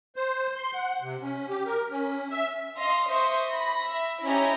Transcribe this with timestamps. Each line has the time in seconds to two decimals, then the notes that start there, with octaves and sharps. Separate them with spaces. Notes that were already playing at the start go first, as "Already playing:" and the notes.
0.16 C5
0.56 C6
0.74 F#5
1.02 C3
1.21 C#4
1.49 G4
1.66 A#4
1.91 C#4
2.30 E5
2.78 D#5 F5 C6
3.08 C5 E5 C6 C#6 D#6
3.51 B5 A#6
3.89 E5
4.24 C#4 E4 G4 D#5 G#5 A#5